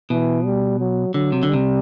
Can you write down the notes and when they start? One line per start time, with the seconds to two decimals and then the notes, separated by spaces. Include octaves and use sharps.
0.10 B2 E3
0.45 G3
0.80 F#3
1.14 D3 F#3
1.32 C3
1.43 D3
1.50 C3 G3